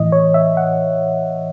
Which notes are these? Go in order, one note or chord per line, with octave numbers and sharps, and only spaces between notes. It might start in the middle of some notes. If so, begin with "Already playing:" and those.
Already playing: A2 E3 D#5
C#5
E5
F#5